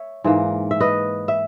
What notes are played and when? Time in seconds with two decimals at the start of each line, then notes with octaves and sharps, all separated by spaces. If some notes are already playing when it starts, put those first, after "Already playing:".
Already playing: C#5 E5
0.24 G#2 E3 A#3
0.71 E5
0.80 B4 D#5
1.28 E5